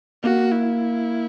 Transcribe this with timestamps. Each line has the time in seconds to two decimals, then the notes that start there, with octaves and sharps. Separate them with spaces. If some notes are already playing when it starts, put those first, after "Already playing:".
0.23 A#3 F#4
0.52 E4